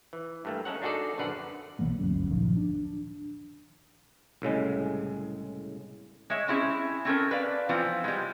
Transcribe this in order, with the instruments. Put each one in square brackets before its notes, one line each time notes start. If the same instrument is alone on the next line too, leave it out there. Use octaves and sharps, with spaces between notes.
[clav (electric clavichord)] E3
G2 A3 A#3
G#3 C#4 A4 A#4 C#5 F#5
D4 D#4 F#4 G#4 A4 D5
A#1 F#2 D3 B4 D5 F#5
[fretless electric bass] B1 E3 A#3 B3
G1 D2 F#3 C#4
D#1 A#1 D#3 F3
D4
[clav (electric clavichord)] C2 A2 C#3 G#3
[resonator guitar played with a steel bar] G#3 C#5 E5
C4 C#4 E4 G#4
C4 C#4 A4 A#4
B4 D5 F5
E3 F3 B3 C4 F4
G3 G#3